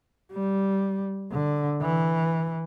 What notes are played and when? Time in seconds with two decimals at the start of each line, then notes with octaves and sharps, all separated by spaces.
0.32 G3
1.32 D3
1.82 E3